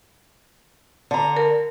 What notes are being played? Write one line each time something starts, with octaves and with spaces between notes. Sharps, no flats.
D3 A#5
A#4